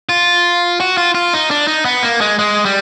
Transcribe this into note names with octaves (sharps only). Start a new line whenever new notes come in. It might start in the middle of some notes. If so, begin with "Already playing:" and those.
F4
F#4
F4
F4
D#4
D4
D#4
B3
A#3
G#3
G#3
G3